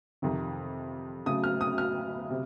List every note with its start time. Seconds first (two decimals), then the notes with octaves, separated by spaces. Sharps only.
0.22 F2 C3 D#3
1.26 C#3 F#3 A3 D#6
1.44 F6
1.61 D#6
1.78 F6
2.30 C3